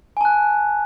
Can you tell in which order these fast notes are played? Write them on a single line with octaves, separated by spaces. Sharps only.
G#5 A5 F#6